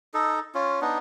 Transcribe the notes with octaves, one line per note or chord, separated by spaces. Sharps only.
D#4 A4
C#4 F4
B3 D4 D#4